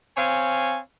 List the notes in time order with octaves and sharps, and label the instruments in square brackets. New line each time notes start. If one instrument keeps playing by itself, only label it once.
[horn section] C4 C#5 F5 G#5